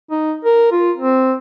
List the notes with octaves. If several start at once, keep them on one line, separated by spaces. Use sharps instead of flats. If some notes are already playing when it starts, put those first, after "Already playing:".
D#4
A#4
F4
C4